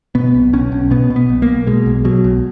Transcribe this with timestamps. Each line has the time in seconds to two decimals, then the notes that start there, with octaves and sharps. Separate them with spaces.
0.15 B2 B3
0.34 B1
0.53 B1 C#4
0.72 B1
0.91 B2 B3
1.10 B2
1.16 B3
1.29 B1
1.42 A#3
1.48 B1
1.67 B2 G#3
1.86 B1
2.05 B2 F#3
2.24 B1